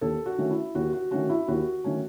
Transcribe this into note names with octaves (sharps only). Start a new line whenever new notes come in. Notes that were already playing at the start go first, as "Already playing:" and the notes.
D#2 A4
F#4
D#3 A3 C#4
E4
D#2 F#4
F#4
D#3 A3 C#4 F#4
E4
D#2 F#4
D#3 A3 C#4